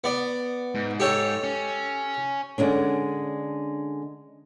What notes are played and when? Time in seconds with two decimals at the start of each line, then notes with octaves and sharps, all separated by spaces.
0.04 B3 D5
0.75 G#2
1.00 G4 A4 C#5
1.44 C#4
2.58 D3 G#3 C#4 D4